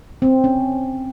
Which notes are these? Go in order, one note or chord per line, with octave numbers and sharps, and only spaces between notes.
C4
C#4